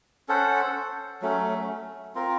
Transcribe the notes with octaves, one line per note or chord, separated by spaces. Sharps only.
C#4 A4 C5 F#5
F#3 A3 C#4
C4 F4 A#4